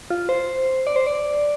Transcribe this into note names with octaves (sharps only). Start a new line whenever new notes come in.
F4
C5
D5
C5
D5